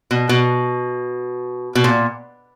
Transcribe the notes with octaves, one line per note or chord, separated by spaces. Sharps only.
B2
B2
B2
A#2